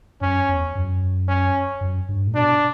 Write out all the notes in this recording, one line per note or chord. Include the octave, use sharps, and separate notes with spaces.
F#2 C#4
E2
F#2
C#4
F#2
G2
A2
B2 D4